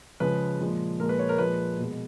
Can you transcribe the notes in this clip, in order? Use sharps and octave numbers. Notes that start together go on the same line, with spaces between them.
C#3 F3 G#3 B4
A#2 F3 G#3
A#2 F3 G#3 A#4
B4
C#5
A#4
A#2 F3 G#3 B4
B2 G#3